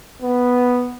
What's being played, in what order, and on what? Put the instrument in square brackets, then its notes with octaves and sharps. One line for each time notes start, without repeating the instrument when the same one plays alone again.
[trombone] B3